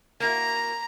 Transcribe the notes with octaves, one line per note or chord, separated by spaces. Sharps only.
A#3 E4 F#4 A#5